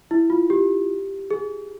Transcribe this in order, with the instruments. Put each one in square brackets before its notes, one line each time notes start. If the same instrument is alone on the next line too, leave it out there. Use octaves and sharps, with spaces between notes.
[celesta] E4
F4
G4
G#4